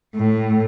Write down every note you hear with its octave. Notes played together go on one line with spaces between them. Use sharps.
A2